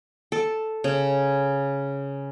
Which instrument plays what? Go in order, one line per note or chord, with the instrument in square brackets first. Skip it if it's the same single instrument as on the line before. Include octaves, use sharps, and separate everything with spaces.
[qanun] A4
C#3